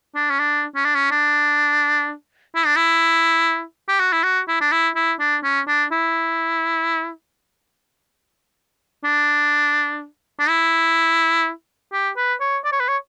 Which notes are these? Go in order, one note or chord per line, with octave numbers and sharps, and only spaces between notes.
D4
C#4
D4
C#4
D4
C#4
D4
E4
D4
E4
G4
F#4
E4
F#4
E4
D4
E4
E4
D4
C#4
D4
E4
D4
D4
E4
G4
B4
C#5
D5
C#5
B4
C#5